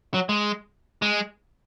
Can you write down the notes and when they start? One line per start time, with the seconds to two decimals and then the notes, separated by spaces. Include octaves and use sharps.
0.14 F#3
0.29 G#3
1.02 G#3